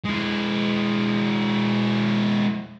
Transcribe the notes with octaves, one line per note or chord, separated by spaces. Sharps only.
G#3 E4